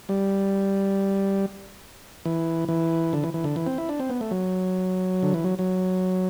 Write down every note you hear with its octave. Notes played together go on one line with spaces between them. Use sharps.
G3
E3
E3
D3
E3
E3
D3
E3
C4
E4
D4
C4
B3
A3
F#3
D3
E3
F#3
F#3